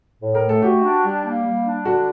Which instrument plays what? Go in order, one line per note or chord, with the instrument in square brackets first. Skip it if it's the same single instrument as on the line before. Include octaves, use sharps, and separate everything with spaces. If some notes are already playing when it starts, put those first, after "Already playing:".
[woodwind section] A2
[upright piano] A#4
[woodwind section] A3
[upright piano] A4
[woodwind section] F#4 [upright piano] G4
[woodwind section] D4
G3
A#3
G3
D4
[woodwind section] D3 [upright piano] F#4